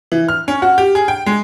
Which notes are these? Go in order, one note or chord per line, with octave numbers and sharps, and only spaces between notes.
E3
F6
C#4
F#4
G4
G#4
G5
G#3